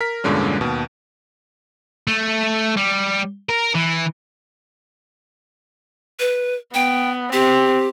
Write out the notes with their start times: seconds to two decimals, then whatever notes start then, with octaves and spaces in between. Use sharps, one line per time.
0.01 A#4 B6
0.24 E2 G2 A#2 D3 G#3 C#4
0.61 D#2 B2
2.08 A3
2.77 G3
3.49 A#4
3.74 E3
6.19 B4
6.74 B3 G5
7.33 C4 G4